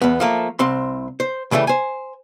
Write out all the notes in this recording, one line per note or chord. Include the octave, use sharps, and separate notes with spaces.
E2 B3
F3 A3 A#3
C2 C4 C6
C5
A2 C#3 E3 G3 A3
C5 G#5